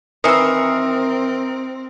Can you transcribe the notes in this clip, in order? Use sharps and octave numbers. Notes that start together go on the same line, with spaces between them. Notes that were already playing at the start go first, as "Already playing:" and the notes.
D#3 E3 C4 A#4 D#6 E6 C7 C#7